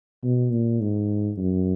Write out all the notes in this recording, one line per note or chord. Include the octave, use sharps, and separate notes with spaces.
B2
A#2
G#2
F#2